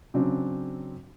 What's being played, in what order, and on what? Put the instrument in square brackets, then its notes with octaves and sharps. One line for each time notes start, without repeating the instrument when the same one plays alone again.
[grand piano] C#3 F#3 C4 D4